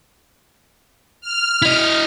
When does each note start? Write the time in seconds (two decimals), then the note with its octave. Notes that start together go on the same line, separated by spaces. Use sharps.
1.21 F6
1.62 E4 D#5